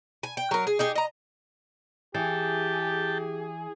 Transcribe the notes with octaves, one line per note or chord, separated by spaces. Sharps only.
G#5
G5
F#3 A#4
G#4
D#4 G4 G#4
D#5 A#5
E3 G4 G#4 G5 A5